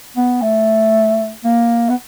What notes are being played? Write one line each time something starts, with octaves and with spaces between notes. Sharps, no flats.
B3
A3
A#3
B3